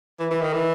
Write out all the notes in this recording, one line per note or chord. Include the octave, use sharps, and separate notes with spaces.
E3
E3
D#3
E3